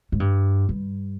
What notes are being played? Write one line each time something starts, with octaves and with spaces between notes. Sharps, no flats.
G#2
G2
G2